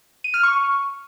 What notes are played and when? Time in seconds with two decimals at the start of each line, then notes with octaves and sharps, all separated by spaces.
0.24 D#7
0.34 F6
0.43 C#6